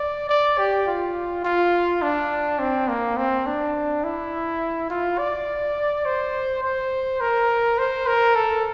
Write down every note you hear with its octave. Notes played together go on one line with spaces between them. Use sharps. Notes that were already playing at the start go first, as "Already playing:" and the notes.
Already playing: D5
D5
G4
F4
F4
D4
C4
A#3
C4
D4
E4
F4
D5
C5
C5
A#4
C5
A#4
A4